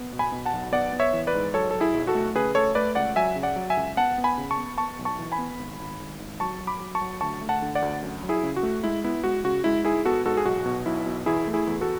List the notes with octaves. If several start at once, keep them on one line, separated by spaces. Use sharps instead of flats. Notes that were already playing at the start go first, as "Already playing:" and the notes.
Already playing: B3
B2
G#5 B5
B2
F#5 A5
B1
B3 D5 F#5
B3
C#5 E5
E3
B4 D5
G#2
F#3 A4 C#5
F#3 A4
E4 G#4
B1
F#4 A4
A3
C#3 G#4 B4
A3 A4 C#5
A3 B4 D5
C#2 D5 F#5
F#3 E5 G#5
C#3
D5 F#5
F#3
E5 G#5
C#2
B3 F#5 A5
B3
G#5 B5
C#3
A5 C#6
B3
B3 A5 C#6
B1
A5 C#6
E3
G#5 B5
B3
G#1
G#1
G#1
G#1
F#3 A5 C#6
F#3
B5 D6
F#3
A5 C#6
F#3
D2 A5 C#6
A3
F#5 A5
D3
D5 F#5
D2
F#2
F#3
E4 G#4
C#3
F#4
A3
G#3 E4
B3 E4
G#3 F#4
C#3 F#4
G#3 E4
G#2 E4 G#4
B3 F#4 A4
G#2 F#4 A4
G#4
B1 F#4
B2
B1 E4
B2
E2 E4 G#4
A3
E4 G#4
E2
F#4 A4